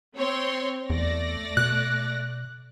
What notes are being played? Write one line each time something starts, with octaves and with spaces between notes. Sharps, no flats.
C4 C#5 C6
E2 A3 D5 A#6
B2 F#6